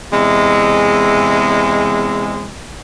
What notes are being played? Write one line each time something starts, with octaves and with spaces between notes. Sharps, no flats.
E2 C3 G#3